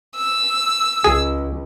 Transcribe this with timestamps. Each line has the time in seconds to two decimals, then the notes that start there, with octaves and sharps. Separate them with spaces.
0.17 E6
1.04 C#2 G#4